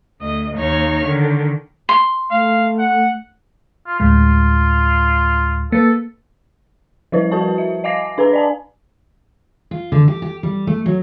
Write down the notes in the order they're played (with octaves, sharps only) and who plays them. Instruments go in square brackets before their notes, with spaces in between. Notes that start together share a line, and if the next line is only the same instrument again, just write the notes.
[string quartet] D2 D#5
D#2 D#4 C#5 C#6 F6
D3 D#3
[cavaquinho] C6
[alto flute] A3 [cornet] F5
[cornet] F#5
[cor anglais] F4
[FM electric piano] D2 A2 G#3 [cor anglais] F4
[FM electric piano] A#3 B4 [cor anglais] A4
[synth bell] F3 G3 E4 B4 C5 D#5
F#4 A#4 C5 A5 C#6
E5
D#5 F5 G#5 D6 A#6 C7
D4 B4 G#5 A#5
D5 G#5 A5
[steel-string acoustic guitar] F4
D3
G4
G4
G3
A3
F#3